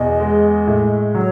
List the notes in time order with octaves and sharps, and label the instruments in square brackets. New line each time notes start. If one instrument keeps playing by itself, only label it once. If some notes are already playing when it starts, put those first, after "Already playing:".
Already playing: [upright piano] E2 B2 [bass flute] D#5
[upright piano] G#3
A2
[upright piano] F#3 [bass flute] C#5